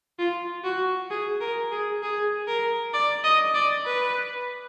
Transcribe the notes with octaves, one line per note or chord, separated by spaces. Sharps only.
F4
F#4
G#4
A#4
G#4
G#4
A#4
D5
D#5
D5
B4